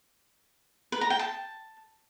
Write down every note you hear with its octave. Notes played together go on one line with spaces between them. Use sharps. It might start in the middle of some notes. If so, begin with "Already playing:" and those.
B4
A#5
G5
A5